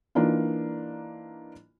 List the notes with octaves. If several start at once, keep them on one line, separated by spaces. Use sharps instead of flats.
E3 A#3 D4 D#4 F4